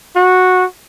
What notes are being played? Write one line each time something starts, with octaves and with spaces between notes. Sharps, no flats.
F#4